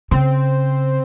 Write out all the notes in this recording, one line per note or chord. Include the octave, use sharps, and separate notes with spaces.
C#3 C4